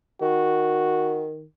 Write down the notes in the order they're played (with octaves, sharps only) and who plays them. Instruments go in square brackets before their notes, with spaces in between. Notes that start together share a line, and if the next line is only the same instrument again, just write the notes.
[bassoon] D#3 [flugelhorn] F#4